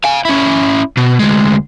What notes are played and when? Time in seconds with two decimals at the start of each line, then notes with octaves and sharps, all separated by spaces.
0.04 F5 G#5
0.25 C#4 E4
0.97 B2
1.19 D2 G#3